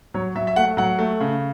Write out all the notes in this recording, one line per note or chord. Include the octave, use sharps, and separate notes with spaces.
F#3 C#5
F#3 E5
E5
A3 F#5
F#3 F#5
A3
C#3